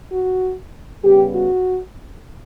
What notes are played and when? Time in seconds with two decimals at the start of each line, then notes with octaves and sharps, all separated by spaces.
0.11 F#4
1.04 C#3 G3 B3 G4
1.35 F#4